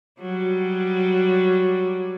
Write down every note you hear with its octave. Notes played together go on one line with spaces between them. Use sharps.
F#3 G3